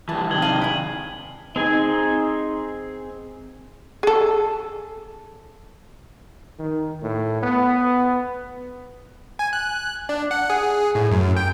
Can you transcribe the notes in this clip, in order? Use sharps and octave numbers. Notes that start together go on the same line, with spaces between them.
E3 G3 A5
C3 D#3 G#6 F#7 G7
D#5 F5 D#7 F#7
E4 G#4
C4 D#4 G#4 G#5
G#4 A4
D#3
A2
B3
G#5
F#6
D4
F#5
G#4
A2
F#2
G5